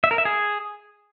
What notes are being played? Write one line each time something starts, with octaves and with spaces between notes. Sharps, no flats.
E5
A#4
E5
G#4